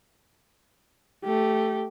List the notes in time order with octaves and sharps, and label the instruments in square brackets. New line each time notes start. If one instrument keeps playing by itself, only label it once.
[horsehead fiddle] A3 G4